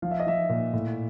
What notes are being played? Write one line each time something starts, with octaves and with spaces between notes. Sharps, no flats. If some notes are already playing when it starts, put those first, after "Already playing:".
F3 F5
E5
D#5
F3 E5
A#2
A2